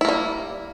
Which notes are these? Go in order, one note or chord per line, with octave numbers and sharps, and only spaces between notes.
G3 A#3 E4